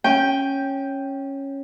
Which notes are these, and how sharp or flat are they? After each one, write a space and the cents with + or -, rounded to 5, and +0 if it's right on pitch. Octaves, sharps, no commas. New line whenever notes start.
C#4 -10 G5 +0